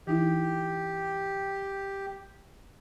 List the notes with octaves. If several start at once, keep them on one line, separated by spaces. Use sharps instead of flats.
E3 D#4 E4 G4